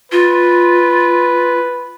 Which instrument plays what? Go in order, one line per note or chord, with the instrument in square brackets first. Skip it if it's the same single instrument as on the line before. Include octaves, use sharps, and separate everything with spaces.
[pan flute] F4 [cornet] B4